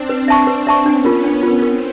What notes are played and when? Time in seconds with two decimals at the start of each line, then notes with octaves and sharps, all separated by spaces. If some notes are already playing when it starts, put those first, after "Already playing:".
Already playing: C4 D4
0.09 B4
0.28 E5 A5 C#6
0.47 B4
0.67 E5 A5 C#6
0.85 B3 C#4 D4
1.05 F4 A#4
1.24 D4
1.43 F4 A#4
1.62 C4 A#4